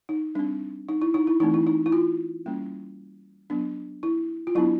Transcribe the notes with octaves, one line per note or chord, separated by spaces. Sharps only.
D#4
G3 C4 D4
D#4
E4
D#4
E4
E3 A3 C4 D#4
E4
D#4
E4
F4
G3 A#3 C#4
F#3 B3 D4
E4
F4
F#3 B3 D4 E4